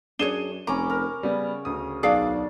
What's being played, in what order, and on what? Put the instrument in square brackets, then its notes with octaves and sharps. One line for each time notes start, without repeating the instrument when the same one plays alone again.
[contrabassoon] F#2 [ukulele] D4 G#4 C#5 [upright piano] D#7 E7 G7
[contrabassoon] F1 [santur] C#4 B5 D6 [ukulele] A#5
[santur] A#4
[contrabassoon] C#3 [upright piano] G3 B3
[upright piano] D2 D#6
[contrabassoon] B1 [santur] D4 [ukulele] G#4 D5 F5